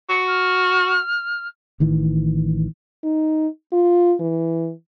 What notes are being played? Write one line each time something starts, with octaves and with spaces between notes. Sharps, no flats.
F#4 C#7
F6
A1 D#3 E3
D#4
F4
E3